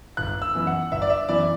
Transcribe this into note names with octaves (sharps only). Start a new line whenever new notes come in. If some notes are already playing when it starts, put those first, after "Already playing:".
G1 F#6
E6
F#2 E3 B3 E4
F#5
G1 E5
D5
E5
F#2 E3 B3 E4 D5